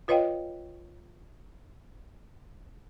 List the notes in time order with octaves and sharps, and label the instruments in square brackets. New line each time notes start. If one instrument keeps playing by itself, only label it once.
[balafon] F4 B4 C#5 D#5 F5 G5